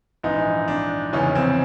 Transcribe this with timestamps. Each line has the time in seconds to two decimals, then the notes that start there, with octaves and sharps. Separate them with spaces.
0.23 A#1 G#2 E3 D#4
0.68 D4
1.13 F1 E2 C#3 E3 C#4
1.35 C4